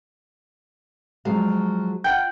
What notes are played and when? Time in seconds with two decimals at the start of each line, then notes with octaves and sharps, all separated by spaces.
1.25 F3 F#3 G#3 F5
2.04 F4 F#5 G5 G6